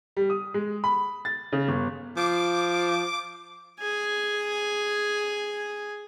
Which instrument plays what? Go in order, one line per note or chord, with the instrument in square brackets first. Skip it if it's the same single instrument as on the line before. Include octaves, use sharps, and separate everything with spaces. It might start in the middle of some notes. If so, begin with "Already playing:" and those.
[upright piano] G3
D#6
G#3
B5
A6
C#3
G1
[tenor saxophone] F3 [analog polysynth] D6
[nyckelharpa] G#4 G#5